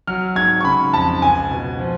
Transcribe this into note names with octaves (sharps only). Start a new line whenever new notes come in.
F#3 F6
G#2 G#6
C#6
C#3 B5
F2 A5
C#2 G#5
B2
F3